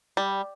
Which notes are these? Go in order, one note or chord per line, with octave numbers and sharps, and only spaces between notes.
G3